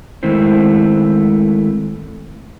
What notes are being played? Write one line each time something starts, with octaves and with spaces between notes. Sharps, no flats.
D#3 G#3 A3 C4 E4 C5